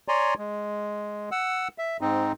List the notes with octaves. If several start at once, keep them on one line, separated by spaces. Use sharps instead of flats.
C#5 D5 G#5 A#5 C6
G#3
F#5 E6
E5
G#2 C4 D#4